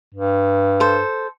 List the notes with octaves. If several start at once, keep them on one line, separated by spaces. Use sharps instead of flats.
G2
A4 C5